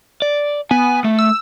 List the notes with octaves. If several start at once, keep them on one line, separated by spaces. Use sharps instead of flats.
D5
B3 G#5
A3
E6